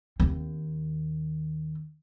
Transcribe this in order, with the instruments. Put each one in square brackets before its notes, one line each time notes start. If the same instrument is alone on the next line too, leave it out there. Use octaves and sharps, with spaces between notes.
[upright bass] D#2 C4